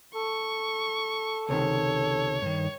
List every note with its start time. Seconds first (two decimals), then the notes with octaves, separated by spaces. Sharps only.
0.15 A4 C#6
1.49 C#2 C3 D#3 C#5
2.42 G2 D#3